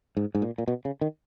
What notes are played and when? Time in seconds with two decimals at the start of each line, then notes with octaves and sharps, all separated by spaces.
0.17 G#2
0.35 G#2
0.42 A#2
0.58 A#2
0.68 B2
0.85 C#3
1.01 D#3